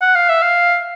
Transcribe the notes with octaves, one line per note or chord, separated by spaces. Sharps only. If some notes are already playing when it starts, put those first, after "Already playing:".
F#5
F5
E5
F5